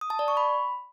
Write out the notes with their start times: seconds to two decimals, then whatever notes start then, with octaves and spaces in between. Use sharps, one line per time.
0.01 D#6
0.10 A5
0.19 D5
0.28 C#6
0.37 B5